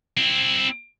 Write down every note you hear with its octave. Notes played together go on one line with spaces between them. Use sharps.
C4 E4